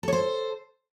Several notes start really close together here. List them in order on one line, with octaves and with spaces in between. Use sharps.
A4 C#5 C5